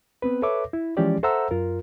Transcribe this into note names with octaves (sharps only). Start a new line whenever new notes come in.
B3 C4 B4
A4 B4 C#5 E5 D6
E4
E3 F3 G#3 C#4 G4 D5
A4 C5 E5 F#5 A#5 E6
F#2 F4 A#4